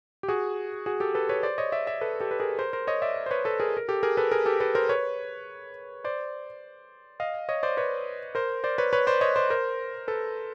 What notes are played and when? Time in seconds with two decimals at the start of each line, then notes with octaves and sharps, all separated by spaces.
0.23 G4
0.28 F#4 G#4
0.86 F#4 G#4
1.00 G4 A4
1.15 A4 B4
1.29 B4 C#5
1.43 C5 D5
1.58 C#5 D#5
1.72 D5 E5
1.87 D5 E5
2.01 A4 B4
2.20 G4 A4
2.31 B4
2.40 G#4 A#4
2.59 A#4 C5
2.73 A#4 C5
2.87 C#5 D#5
3.02 D5 E5
3.26 C5
3.31 B4 C#5
3.45 A4 B4
3.60 G#4 A#4
3.77 A#4
3.88 G4 A4
4.03 G#4 A#4
4.17 A4 B4
4.31 G#4 A#4
4.46 G4 A4
4.60 A4 B4
4.75 A#4 C5
4.89 B4 C#5
6.04 C5 D5
7.20 D#5 F5
7.49 C#5 D#5
7.63 C5 D5
7.77 B4 C#5
8.35 A#4 C5
8.64 C5 D5
8.78 B4 C#5
8.93 B4 C#5
9.07 C5 D5
9.21 C#5 D#5
9.36 C5 D5
9.50 A#4 C5
10.08 A4 B4